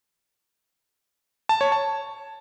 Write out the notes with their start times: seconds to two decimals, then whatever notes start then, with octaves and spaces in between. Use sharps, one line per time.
1.49 A5
1.61 C#5
1.72 A5